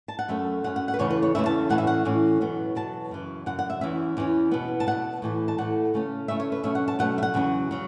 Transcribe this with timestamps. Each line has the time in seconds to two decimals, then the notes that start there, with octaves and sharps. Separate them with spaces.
0.08 A5
0.19 F#5
0.28 F#2 F#3 A3 C#4 E5
0.64 F#2 F#3 A3 C#4 F#5
0.76 F#5
0.88 F#5
0.94 B4
0.99 E2 C#3 E3 A3 C#4 C#5
1.10 B4
1.22 C#5
1.35 E2 C#3 E3 A3 C#4 E5
1.46 A5
1.70 A2 E3 C#4 F#5
1.78 E5
1.87 F#5
2.05 A2 E3 C#4
2.41 E2 B2 F#3 B3
2.75 E2 B2 F#3 B3 A5
3.11 F#2 C#3 E3
3.46 F#2 C#3 F#5
3.59 F#5
3.70 E5
3.81 E2 E3 C#4 E5
4.17 E2 E3 C#4
4.51 B2 B3
4.80 A5
4.87 B2 B3 F#5
5.22 A2 E3 A3
5.48 A5
5.58 A2 E3 A3 F#5
5.94 C#3 A3 C#4
6.28 C#3 A3 C#4 E5
6.40 C#5
6.52 B4
6.63 B2 F#3 A3 C#4 E5
6.75 F#5
6.88 A5
6.99 B2 F#3 A3 C#4 F#5
7.18 E5
7.23 F#5
7.34 E2 C#3 F#3 C#4
7.71 C#3 F#3